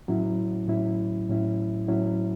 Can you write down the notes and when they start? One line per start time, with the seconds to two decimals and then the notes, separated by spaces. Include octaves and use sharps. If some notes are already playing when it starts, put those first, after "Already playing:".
0.08 A2 F#3 C#4 E4
0.68 A2 F#3 C#4 E4
1.29 A2 F#3 C#4 E4
1.88 A2 F#3 C#4 E4